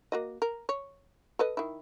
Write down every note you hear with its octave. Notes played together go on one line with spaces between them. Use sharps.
A#3 F#4 D#5
A#4
C#5
A4 B4 D#5
D#3 E4